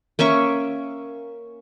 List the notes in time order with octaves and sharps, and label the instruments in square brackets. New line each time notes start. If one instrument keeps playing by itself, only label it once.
[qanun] A#3 C#4 E5 C#6